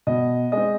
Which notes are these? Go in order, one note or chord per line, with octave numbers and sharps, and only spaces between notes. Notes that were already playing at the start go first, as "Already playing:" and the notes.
B2 D#5
G#3 C4 D#5